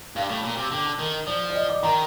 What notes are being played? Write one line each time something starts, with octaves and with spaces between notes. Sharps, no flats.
G2 F5
A2
A#2
C3
D3 G5
A5
D#3
F3 D5
D5
D#5
D6
D#3 A#5